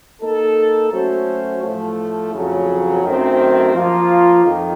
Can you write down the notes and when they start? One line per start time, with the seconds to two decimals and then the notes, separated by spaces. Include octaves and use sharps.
0.21 A#3 D#4 A4
0.91 F#3 A3 C#4 F#4 C5
1.62 A2 F3 A3
2.33 F2 C#3 F#3
3.03 F#2 D#3 A3 C4
3.73 F3 A#3 F4
4.44 F2 D#3